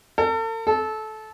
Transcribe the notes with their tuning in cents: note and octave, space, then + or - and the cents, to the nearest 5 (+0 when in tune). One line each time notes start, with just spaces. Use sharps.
A4 +40
A4 -20